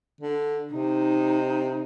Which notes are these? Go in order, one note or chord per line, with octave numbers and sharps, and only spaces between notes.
D3
C3 D#4